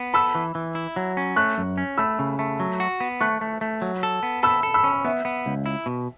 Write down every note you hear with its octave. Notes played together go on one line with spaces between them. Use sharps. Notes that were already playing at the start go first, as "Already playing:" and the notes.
Already playing: B3
A4 B5 E6
E3
E3
E4
F#3
C#4
A3 C#6 F#6
F#2
C#4
A3 B5 E6
C#3
A3
F#3
F#4
B3
A3 C#6 F#6
A3
A3
F#3
A4
B3
A4 B5 E6
A4
B5 E6
C#4
B3 E5
B3
C#2
E4
B2